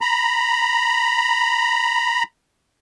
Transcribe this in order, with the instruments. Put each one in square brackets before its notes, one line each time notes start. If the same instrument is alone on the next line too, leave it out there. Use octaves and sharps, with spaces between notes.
[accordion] A#5 B5